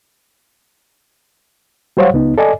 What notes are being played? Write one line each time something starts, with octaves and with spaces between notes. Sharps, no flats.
F#3 G3 C5 C#5 F5 F#5
C#2 B3 D#4
A4 D5 D#5 G#5